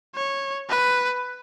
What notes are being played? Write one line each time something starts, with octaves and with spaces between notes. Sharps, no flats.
C#5
B4